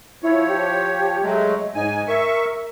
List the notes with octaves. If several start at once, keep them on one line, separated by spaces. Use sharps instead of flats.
F3 E4 C#5
G4
F#3 G#3 A3
G#2 D#4 G#5
A#4 E5 C#6